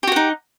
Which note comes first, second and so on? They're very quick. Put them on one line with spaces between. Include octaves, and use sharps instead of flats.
G4 F#4 F#5 D#4